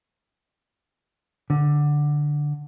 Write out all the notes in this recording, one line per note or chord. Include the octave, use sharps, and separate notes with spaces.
D3